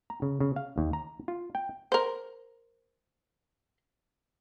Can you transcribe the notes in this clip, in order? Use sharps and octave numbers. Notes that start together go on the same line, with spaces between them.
A#5
C#3
C#3
F5
D#2
A#5
F4
G5
A#4 C5